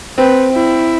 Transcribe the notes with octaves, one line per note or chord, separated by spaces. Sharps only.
C4 B4
E4